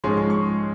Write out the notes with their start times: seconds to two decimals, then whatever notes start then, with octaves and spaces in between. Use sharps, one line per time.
0.04 G#2 F3 G#3 C#4 C6
0.17 C6
0.30 C#6